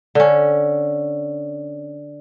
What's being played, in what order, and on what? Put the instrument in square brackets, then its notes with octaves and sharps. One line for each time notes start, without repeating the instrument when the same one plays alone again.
[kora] D3 C#4